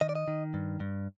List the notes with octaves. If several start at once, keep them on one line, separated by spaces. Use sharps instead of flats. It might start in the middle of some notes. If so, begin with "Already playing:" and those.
D#3 D#5
D5
D#5
D#3
G2
G2